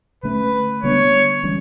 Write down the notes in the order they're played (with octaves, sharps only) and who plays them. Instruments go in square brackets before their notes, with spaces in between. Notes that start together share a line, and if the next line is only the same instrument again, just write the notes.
[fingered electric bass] D3 A3 C#4 [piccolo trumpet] B4
[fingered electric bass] D3 G3 B3 D4 [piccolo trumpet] C#5
[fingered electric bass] E3 G3 C#4